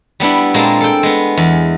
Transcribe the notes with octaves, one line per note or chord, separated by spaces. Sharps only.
G3 B3 D4 E4
A#2 G#3 A#3 C4 A5
A4 G5
G#3 B3
E2